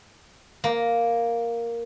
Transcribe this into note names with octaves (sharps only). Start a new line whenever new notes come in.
A#3